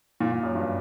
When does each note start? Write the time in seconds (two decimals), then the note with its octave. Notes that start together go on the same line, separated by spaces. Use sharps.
0.20 A#2
0.32 A#2
0.43 F#2
0.55 G2